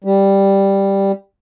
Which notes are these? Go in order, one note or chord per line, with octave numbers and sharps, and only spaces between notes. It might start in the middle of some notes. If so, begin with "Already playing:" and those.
G3